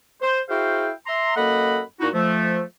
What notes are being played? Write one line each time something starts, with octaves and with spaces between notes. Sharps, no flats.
C5
E4 F#4 G#4 C5 F5 G5
E5 A#5 C6
F#2 A#3 A4 D#5 F#5 B5
A#2 D#4 E4 F#4
F3 A3